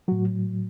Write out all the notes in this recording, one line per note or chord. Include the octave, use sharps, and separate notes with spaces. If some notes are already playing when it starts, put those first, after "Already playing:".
A2 F#3 F#4